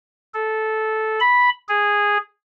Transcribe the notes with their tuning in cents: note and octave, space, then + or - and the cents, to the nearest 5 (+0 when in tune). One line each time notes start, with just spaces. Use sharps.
A4 -10
B5 -5
G#4 -10